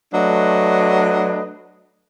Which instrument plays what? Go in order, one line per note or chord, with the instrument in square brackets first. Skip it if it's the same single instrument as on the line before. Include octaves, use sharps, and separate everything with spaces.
[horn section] F#3 A3 D4 B4 D#5